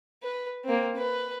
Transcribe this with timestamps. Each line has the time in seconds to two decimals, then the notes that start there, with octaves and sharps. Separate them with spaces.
0.23 B4
0.65 A#3 C4
0.96 B4